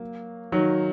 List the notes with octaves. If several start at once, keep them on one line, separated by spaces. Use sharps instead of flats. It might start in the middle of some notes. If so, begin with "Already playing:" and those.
Already playing: F#3 A#3
D#3 F#3